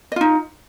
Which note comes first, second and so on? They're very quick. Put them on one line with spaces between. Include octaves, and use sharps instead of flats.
D#5 F4 D#4